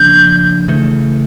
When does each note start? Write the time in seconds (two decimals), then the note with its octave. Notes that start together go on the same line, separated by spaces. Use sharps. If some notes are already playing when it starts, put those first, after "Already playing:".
Already playing: C#3 F3 A#3 D4 G6
0.68 C#3 E3 A3